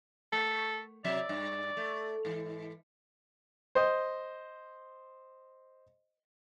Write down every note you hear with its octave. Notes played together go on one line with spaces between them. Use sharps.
A3 A4
C3 F#3 D5 E5
G2
A3
G#2 E3
C5 D#5